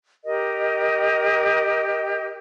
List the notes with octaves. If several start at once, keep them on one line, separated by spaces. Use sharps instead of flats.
G4 A#4 D#5